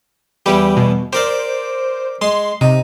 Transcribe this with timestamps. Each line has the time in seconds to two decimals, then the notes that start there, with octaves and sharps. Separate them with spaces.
0.46 E2 E3 G3 G4
0.77 B2
1.13 G4 A#4 C5 D5
2.21 G#3 C6
2.61 C3 D#4